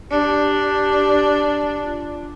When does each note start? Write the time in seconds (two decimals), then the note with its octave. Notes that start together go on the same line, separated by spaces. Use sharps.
0.11 D4 G4
1.83 F4